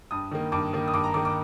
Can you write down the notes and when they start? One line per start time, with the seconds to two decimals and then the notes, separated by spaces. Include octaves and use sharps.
0.11 G2 D#6
0.31 D#3 A#3
0.52 G2 D6
0.73 D#3 A#3
0.88 D#6
0.94 G2 D6
1.04 A#5
1.14 D#3 A#3 D6
1.25 D6